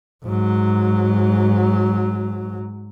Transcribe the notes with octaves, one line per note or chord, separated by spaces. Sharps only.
G#2 F#3